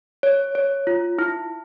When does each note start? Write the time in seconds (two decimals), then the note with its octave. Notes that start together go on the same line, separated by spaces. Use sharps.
0.23 C#5
0.55 C#5
0.87 F4
1.19 E4